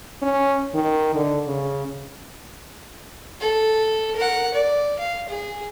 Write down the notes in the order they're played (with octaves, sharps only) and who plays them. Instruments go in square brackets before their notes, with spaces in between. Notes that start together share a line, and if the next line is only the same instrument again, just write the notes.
[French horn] C#4
D#3
D3
C#3
[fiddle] A4
A#4 F#5
D5
F5
G#4